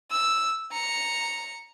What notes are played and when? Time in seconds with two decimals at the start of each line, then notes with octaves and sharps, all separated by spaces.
0.11 E6
0.72 A#5 C#7